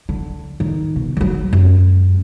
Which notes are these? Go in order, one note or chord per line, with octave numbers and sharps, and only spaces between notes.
D3
D#3
B2
D#3 F#3
F#2 G#3